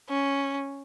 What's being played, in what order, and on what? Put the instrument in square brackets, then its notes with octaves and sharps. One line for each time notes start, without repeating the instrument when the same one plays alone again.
[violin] C#4